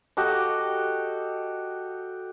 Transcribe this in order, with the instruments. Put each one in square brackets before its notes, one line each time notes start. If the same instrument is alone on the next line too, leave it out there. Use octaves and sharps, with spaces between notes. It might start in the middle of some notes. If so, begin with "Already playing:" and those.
[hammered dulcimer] F#4 G4 A4 D#5